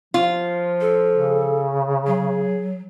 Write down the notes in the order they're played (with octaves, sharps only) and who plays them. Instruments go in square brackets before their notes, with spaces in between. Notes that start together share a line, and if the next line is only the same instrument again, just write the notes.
[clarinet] F3 [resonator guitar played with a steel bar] F4
[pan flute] A4
[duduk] C#3
[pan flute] F#3 [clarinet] G#4